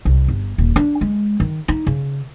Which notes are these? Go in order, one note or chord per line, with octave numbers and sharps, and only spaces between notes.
C2
G1
D#1
D4
G#3
D#3
D#4
C#3